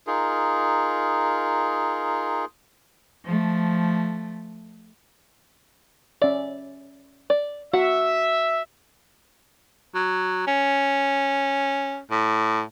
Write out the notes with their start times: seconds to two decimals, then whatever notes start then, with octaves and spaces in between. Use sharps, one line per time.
0.07 D#4 F4 G#4 A#4
3.25 F3 A3
6.22 C#4 D5 E5
7.30 D5
7.74 F#4 E5 F#5
9.95 F#3
10.47 C#4
12.11 A2